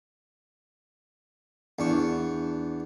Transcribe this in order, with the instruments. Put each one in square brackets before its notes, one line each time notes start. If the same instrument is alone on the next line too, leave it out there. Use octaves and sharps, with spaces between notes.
[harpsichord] E2 D4 C#6